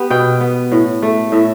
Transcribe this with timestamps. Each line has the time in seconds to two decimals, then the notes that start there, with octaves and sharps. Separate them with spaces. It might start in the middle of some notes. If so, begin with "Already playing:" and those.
Already playing: B3 G4
0.10 B2 G5
0.41 B3
0.72 A2
1.02 A3
1.32 A2 E5